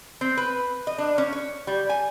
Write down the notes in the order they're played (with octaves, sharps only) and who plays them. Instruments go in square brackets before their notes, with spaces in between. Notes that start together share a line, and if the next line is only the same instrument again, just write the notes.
[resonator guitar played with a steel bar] C4
B4
D#5
D4
C#4
C#5
G3
G#5